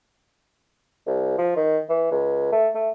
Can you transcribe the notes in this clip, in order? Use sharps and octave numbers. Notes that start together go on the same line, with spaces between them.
C2
F3
D#3
E3
C#2
A3
A3